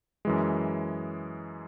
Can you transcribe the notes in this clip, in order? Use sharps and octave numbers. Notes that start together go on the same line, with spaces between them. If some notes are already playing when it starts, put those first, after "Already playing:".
F#2 E3 G#3